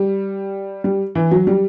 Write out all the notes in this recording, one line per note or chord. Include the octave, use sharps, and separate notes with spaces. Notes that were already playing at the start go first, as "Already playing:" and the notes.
Already playing: G3
G3
E3
F#3
G3